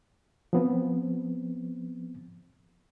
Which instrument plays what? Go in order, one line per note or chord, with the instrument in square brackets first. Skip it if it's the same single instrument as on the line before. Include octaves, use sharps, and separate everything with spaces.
[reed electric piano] F3 B3 C4